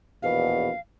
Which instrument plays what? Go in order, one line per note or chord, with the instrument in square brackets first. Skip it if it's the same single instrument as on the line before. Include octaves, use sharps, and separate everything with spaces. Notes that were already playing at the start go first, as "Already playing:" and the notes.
[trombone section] A#1 E2 B2 [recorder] F5